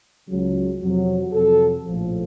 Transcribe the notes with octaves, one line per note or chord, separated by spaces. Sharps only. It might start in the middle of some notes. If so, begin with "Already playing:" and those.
C#2 C#3 F#3
F2 C3 F#3
F2 C3 F#3 A4
A#1 A2 F3